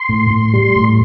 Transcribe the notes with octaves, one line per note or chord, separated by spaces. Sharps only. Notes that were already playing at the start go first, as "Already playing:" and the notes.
Already playing: C6
A2
A2
G3
A2